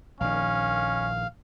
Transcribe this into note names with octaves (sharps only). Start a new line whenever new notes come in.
A#1 D#3 C#4 F5